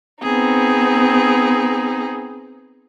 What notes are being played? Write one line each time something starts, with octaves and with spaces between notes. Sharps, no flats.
B3 C4 D#4 G#4